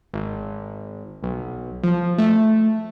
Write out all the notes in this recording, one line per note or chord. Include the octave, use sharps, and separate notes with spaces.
G#1
B1
F3
A3